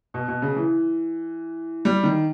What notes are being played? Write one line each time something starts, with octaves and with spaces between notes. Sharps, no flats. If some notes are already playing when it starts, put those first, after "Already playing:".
B2
B2
C#3
E3
G3
D#3